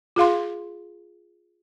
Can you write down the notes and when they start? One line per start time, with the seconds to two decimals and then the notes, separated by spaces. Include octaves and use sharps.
0.16 F4 G#4 F5 C6